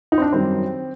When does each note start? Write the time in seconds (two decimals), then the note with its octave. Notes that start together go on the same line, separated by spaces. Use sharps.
0.12 D#4
0.18 C4
0.22 D4
0.33 F#2 D#3 G3 C4